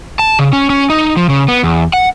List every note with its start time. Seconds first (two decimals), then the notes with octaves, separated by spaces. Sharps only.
0.19 A5
0.39 C#3
0.53 C#4
0.70 C#4
0.90 D#4
1.16 F3
1.29 C#3
1.48 B3
1.64 E2
1.93 F#5